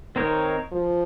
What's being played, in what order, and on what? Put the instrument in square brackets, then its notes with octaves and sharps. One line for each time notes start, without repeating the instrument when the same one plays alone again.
[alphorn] D#3 [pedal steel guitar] C4 D#4 A#4 C#5
[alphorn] F3